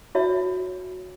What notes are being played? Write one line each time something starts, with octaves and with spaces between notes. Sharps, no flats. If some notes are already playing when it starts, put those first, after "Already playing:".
E4 F#4 C#5 E5